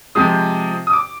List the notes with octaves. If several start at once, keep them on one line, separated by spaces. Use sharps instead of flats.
C3 F3 G#3 D#6
D#6
D6